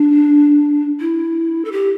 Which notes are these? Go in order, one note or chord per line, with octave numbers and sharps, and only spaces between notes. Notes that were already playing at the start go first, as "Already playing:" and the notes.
Already playing: D4
E4
A4
G4